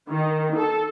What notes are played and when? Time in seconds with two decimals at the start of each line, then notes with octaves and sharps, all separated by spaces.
0.10 D#3
0.57 A4